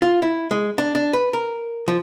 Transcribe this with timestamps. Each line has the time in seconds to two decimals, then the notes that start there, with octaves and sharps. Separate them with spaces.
0.02 F4
0.22 E4
0.51 G#3
0.78 D4
0.95 D4
1.13 B4
1.33 A#4
1.88 F3